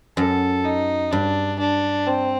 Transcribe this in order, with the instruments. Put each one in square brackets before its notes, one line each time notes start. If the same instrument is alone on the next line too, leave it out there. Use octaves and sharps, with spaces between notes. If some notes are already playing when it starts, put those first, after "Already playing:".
[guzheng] F#2 [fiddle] A4
[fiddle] D#4
[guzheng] G2 [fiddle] D4
[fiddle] D4
C4